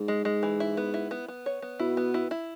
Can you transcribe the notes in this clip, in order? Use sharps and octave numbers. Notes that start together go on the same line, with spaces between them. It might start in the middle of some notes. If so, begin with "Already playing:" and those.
Already playing: G#2
G#3
G#3
E3
E4
B3
E4
B3
B3
C#5
B3
B2 E4
B3
E4
E4